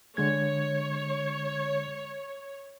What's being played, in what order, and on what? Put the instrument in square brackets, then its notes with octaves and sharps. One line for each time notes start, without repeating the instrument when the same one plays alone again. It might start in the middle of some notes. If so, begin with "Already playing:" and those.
[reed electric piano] D3 G#3 G#6 [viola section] C#5